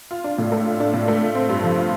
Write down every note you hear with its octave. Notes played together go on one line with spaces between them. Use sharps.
F4
D4
A2
A3
F4
D4
A2
A3
F4
C4
G2
F3
F4